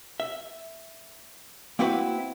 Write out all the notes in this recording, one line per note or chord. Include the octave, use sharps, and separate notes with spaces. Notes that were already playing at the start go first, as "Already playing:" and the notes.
E5
A#3 C4 E4 F#4 B4